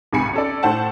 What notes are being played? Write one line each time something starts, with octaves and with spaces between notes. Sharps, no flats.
G#1 C#2 C3 G#5 B5 C#7
C#4 A4 D5
A2 A3 C5 F#5 A5